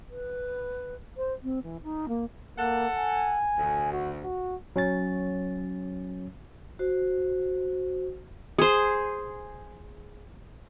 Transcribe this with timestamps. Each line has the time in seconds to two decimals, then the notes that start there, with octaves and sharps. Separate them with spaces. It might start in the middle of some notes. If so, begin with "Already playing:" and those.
0.10 B4
1.17 C5
1.43 C4
1.63 E3
1.83 D#4
2.08 A#3
2.58 A#3 A4 F#5
2.97 G#5
3.59 D2
3.93 F#4
4.24 F#4
4.76 F#3 C#4 C#5 A6
6.79 F#4 C5
8.59 G#4 C5